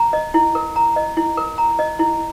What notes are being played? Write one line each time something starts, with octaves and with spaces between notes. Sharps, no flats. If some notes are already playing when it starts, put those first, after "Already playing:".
Already playing: A#5
D#5
E4
A#4
A#5
D#5
E4
A#4
A#5
D#5
E4